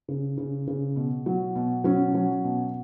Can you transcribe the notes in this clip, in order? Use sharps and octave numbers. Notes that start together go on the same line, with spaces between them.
C#3
C#3
C#3
B2
F#3
B2
F#3 C#4
F#3
B2